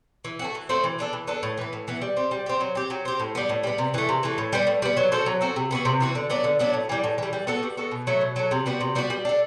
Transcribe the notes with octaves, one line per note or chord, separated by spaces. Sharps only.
E3
C4 F#4
A3
E3
A3 C4 F#4
E3
B3 D4 A4
E3
B3 D4 A4
A2
E3 B3
A2
E3 B3
G3
C4 G4
G3
C4 G4
F#3
C4 G4
F#3
C4 G4
A2
G3 B3
A2
G3 B3
C3
E3 A3
C3
E3 A3
A2
G3 B3
A2
G3 B3
F#3
C4 F#4 A4
F#3
C4 F#4 A4
C3
E3 B3 F#4
C3
E3 B3 F#4
D3
F#3 B3 D4
D3
F#3 B3 D4
A2
E3 G3
A2
E3 G3
G3
B3 F#4 A4
G3
B3 F#4 A4
B2
F#3 A3
B2
F#3 A3
C3
G3 B3 F#4
C3
G3 B3 F#4
G3
D4 A4